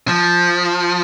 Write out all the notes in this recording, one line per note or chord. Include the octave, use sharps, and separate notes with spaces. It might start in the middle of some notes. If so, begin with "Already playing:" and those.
F3